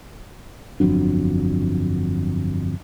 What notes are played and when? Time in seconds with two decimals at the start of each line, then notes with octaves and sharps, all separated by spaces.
0.80 G1 F2 F#3 D4